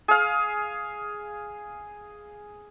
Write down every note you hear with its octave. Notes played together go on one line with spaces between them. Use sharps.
G#4 F5